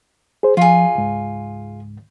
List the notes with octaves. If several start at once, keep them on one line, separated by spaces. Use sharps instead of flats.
G#4 C5
F3 F4 G#4
C#2 G#2